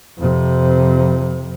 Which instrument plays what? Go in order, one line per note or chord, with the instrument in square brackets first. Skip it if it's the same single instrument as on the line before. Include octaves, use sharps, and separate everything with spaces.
[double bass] F2 C3